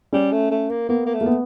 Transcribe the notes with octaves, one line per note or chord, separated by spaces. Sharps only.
G3 C#4
A3
A3
A#3
A#3 B3
A#3
A3
A#3
B3